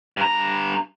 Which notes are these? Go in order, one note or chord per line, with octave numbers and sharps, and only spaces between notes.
G2 A#5